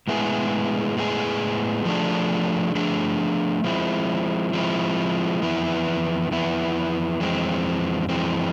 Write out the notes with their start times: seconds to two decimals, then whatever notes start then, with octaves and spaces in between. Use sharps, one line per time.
0.08 A2 G#3 B3 E4 G#4
0.97 A2 G#3 B3 E4 G#4
1.85 F3 A3 D4 G#4
2.75 F3 A3 D4 G#4
3.64 F3 G#3 C4 E4
4.53 F3 G#3 C4 E4
5.42 F2 E3 B3 E4
6.31 F2 E3 B3 E4
7.20 F2 E3 G#3 C4
8.09 F2 E3 G#3 C4